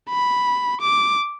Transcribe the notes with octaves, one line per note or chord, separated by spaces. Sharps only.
B5
D6